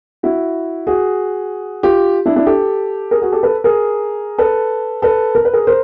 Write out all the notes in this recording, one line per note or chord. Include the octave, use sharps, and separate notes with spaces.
E4 F#4
F#4 G#4
F4 G4
D4 E4
D4 E4
G4 A4
G#4 A#4
F#4 G#4
G4 A4
A4 B4
G#4 A#4
A4 B4
A4 B4
A#4
B4
G#4 A#4
A#4 C5